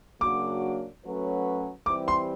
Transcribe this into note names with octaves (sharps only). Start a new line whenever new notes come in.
C#3 F#3 A#3 D4 F#4 D6
F#3 A3 C#4 F#4 B4
E3 G3 C4 E4 G4 D6
C6